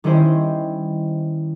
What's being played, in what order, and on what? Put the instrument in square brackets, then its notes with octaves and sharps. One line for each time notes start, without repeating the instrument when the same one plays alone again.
[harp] D#3 G3 C#4 E4 C5